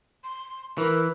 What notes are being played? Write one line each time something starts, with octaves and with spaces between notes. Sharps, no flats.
C6
E3 A#4